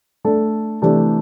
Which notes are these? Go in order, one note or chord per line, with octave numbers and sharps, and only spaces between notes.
A3 D4 A4
C3 E3 A3 D4 G4